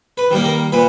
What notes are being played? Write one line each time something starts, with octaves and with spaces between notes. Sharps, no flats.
B4
D#3 G3 A#3
A#4
A#2 B4